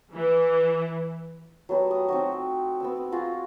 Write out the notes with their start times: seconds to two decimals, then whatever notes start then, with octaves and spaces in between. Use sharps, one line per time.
0.14 E3
1.69 F#3 A3 B3 G4
1.91 D#6
2.09 C4 D#4 F#4
2.80 B3 C4 E6
3.12 F4 F#4 G#4 A#5